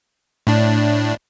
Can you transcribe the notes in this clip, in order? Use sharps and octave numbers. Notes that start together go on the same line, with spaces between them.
A2 D4